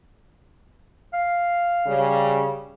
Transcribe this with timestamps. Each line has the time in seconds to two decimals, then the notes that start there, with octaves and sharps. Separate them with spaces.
1.14 F5
1.87 C#3 G3